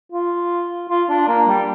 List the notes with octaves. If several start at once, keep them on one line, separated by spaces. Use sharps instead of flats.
F4
F4
D4
A#3
G3